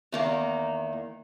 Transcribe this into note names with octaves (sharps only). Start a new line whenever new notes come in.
E2 D#3 A#3